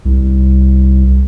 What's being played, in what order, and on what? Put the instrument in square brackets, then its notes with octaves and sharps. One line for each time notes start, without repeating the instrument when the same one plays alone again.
[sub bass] C2